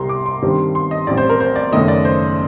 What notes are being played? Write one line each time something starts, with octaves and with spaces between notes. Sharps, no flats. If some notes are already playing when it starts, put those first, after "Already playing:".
Already playing: C2 C3 G3 A#5 C6
D6
C6
G2 D#3 G3 C4
C6
D#5
A1 A2 G3 C4 D5
C5
A#4
C5
D5
F#1 F#2 D#3 A3 D#5
D5
C5